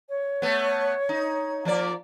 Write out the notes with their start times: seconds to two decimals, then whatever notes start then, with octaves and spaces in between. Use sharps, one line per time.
0.09 C#5
0.42 A3 B3
1.09 D#4
1.65 F3 A#3 D5